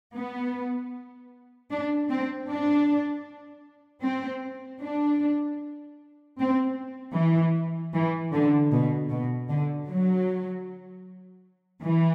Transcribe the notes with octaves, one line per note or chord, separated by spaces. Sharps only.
B3
D4
C4
D4
C4
D4
C4
E3
E3
D3
B2
B2
D3
F#3
E3